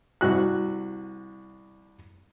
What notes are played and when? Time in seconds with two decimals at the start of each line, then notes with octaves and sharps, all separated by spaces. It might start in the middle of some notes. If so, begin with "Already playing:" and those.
0.21 C2 F#4 F#6